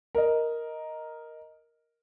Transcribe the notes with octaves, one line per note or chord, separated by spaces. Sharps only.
A#4 D#5